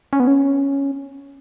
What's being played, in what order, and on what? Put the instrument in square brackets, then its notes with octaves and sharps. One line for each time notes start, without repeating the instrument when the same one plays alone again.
[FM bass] C#4
B3
C#4